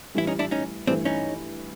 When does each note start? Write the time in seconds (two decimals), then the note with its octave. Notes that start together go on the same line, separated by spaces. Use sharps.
0.15 A2 E3 G3 E4
0.27 C#4 D#4
0.39 D4 E4
0.51 C#4 D#4
0.87 G2 E3 A3 C4 D4
1.05 C#4 D#4